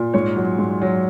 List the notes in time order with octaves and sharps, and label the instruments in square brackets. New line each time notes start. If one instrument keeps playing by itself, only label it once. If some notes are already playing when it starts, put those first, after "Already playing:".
Already playing: [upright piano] A#2
G#2 C#5
F#3
G#2
F#3